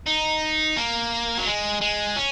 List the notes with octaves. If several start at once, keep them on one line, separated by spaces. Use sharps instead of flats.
D#4
A#3
F#3
G#3
G#3
C#4